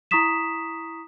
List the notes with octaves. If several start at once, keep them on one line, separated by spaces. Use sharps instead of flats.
E4 A#5 C#6 D#6 B6 E7